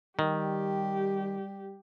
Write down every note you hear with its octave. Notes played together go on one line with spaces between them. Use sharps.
D#3 G3 G4